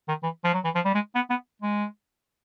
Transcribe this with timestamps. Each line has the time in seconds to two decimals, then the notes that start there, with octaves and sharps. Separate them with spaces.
0.08 D#3
0.23 E3
0.44 F3
0.54 F#3
0.64 E3
0.75 F3
0.85 G3
0.94 G#3
1.15 B3
1.30 B3
1.62 G#3